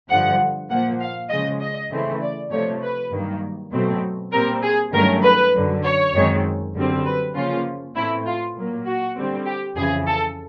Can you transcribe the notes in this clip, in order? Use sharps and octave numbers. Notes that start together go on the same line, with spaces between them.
G2 D3 F3 F#5
A#2 F3 A#3 F#5
F5
C#3 F3 G#3 D#5
D#5
C#3 E3 A3 C4
D5
C3 F3 A3 C#5
B4
G2 D#3 F#3 A#3
B2 F#3 A3 C4
A#2 G3 C4 A#4
G#4
G2 D#3 F#3 A3 C#4 A#4
B4
F#2 D3 F#3
C#5
F#2 D#3 G#3 C4
F#2 D3 G3 C4
B4
C#3 F3 A#3 C#4 F4
A2 E3 A3 C4 E4
F4
A#2 F#3 A#3
F#4
D3 G3 C4
G4
F2 C#3 E3 G#4
A4